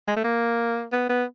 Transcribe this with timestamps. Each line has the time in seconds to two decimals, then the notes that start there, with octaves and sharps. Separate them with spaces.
0.08 G#3
0.16 A3
0.24 A#3
0.93 B3
1.10 B3